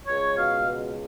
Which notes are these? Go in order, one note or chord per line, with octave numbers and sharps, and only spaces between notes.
C#2 C#5
B2 F5
C#2